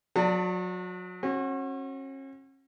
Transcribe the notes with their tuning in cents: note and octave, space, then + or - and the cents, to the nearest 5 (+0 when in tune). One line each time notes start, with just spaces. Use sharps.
F#3 -30 D5 +0 A5 +30
C#4 -40 F#4 +0